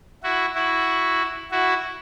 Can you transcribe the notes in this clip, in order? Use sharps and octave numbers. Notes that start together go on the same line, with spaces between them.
E4 F#4
E4 F#4
E4 F#4